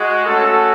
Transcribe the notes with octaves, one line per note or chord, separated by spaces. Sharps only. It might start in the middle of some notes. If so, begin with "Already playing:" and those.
Already playing: G#3 F#4
A3 C#4 F#4 A4